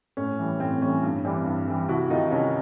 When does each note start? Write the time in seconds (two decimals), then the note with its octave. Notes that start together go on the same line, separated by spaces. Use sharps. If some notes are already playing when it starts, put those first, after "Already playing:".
0.17 A2 C#4
0.39 E3 G3
0.60 A2 C4
0.81 E3 G3 C#4
1.03 G2
1.25 E3 G3 C4 D4
1.46 G2
1.67 E3 G3
1.89 C2 E4 F#4
2.10 C3 D#3 D#4 F4
2.31 C2 C#4 D#4